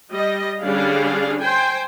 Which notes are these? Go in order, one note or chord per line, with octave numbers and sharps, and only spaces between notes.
G3 D#5
D3 G3 C#4 D4 G#4 F5
C5 G5 G#5